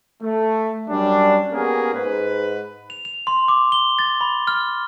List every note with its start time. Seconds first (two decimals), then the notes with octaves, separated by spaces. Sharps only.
0.22 A3
0.88 F#2 G3 C#4 D4
1.52 A#3 B3 C#4 G4 G#4 A#4
1.94 G#2 B4
2.90 F7
3.05 F7
3.27 C6
3.48 D6
3.72 G7
3.99 A6
4.21 B5
4.47 F6